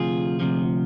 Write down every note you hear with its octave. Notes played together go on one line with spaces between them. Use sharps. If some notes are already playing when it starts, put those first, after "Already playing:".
Already playing: D2 C3 F3 F4 G#4
D2 C3 F3